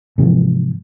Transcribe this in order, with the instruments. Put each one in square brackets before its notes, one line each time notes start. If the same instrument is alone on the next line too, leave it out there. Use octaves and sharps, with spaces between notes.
[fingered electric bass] G#2 C3 E3 F3